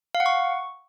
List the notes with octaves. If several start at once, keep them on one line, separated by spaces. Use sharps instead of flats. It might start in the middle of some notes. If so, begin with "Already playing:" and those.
F5
F#5
C#6